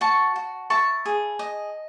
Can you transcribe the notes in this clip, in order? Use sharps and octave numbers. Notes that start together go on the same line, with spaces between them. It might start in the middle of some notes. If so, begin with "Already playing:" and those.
F#4 A5 C#6
F#4
E4 A5 C#6
G#4
D#5